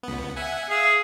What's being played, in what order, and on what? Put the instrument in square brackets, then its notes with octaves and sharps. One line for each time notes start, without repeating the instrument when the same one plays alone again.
[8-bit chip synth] C#2 B3
E5 F#5 G#5
[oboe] G#4 [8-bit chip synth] E5 F5 E6